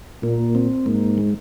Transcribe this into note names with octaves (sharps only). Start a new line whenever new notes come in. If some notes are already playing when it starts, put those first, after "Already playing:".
A#2 A#3
C4
G#2 A#3
G#3